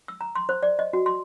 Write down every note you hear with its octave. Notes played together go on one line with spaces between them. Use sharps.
E6
A#5
C6
C5
D5
D#5
F#4
C6